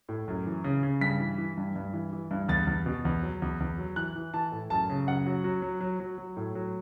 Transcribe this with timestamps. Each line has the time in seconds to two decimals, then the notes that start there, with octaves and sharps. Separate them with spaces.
0.09 A2
0.28 F#2
0.46 E3
0.64 C#3
0.83 C#3
1.01 G2 B6
1.20 E3
1.38 E3
1.57 G2
1.76 G2
1.93 E3
2.13 E3
2.31 G2
2.48 E2 A6
2.67 E2
2.86 B2
3.05 E2
3.22 F#3
3.42 E2
3.60 E2
3.78 F#3
3.96 E3 F#6
4.15 E3
4.34 E3 A5
4.52 A2
4.70 F#2 A5
4.90 C#3
5.07 F#2 F#5
5.26 F#3
5.44 F#3
5.62 F#3
5.81 F#3
6.00 F#3
6.18 F#3
6.37 A2
6.55 F#3